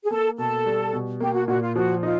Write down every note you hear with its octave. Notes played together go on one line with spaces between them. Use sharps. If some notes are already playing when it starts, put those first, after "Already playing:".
G#4
A#3 A4
B2 A4
G3
B2
A#3 G4
F#4
A#2 F#4
F4
F3 F#4
D#4 F4